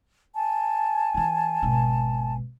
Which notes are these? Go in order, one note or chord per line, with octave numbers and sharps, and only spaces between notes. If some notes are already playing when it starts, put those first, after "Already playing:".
G#5 A5
E3 F4
G#1 B2